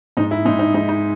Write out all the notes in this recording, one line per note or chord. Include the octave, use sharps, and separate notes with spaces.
G#2 D#4
E4
G#2 D#4
D#4
G#3 D#4
D#4